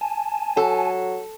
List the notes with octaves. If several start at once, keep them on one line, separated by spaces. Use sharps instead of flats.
G#5 A5
F#3 A4